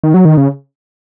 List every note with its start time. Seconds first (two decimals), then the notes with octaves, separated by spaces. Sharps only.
0.04 D#3
0.14 F#3
0.25 D#3
0.37 C#3